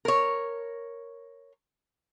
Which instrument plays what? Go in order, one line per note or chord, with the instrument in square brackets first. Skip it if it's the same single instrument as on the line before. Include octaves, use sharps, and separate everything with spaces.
[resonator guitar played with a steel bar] A#4 C#5